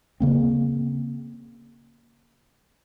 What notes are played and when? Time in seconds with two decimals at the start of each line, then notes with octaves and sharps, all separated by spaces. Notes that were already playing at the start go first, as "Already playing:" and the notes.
0.20 C#3 A#3 C4